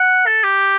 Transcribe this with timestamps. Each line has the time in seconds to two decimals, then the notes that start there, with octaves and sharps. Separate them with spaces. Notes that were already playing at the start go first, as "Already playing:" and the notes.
Already playing: F#5
0.26 A4
0.44 G4